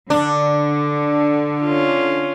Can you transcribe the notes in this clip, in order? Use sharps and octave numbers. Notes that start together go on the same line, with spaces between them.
D3 D4
C#4 F4